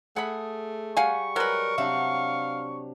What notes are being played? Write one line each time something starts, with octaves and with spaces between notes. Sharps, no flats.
A3 G#4 F#5 B5
G3 F5 F#5 G#5 C#6
F#3 G#3 A#4 B4
C3 F#3 D4 E5 F5